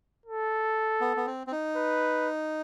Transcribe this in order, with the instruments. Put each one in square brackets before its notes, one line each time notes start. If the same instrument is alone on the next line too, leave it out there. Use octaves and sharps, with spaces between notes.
[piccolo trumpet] A4
[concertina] B3
B3
C4
C4
D#4
[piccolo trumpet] B4